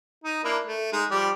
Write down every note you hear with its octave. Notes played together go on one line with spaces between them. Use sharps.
D#4
A#3 D4 E4
A3
G#3 D#4
F3 G3 D5